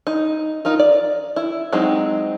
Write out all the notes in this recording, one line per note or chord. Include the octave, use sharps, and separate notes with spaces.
D#4
D#4 F4 A#4
D5
E4
F#3 G#3 C4 D#4